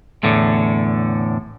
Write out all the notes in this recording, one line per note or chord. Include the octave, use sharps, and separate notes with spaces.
E2 A2 D3